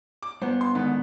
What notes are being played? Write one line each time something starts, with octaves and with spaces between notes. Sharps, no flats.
D6
G2 B3 C5
C6
G#2 D3 D#3 B3